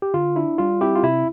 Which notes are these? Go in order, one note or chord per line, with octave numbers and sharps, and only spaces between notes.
G4
D3 F4
D4 E4
G3 F4
C4 E4 G4
F4
C3 E4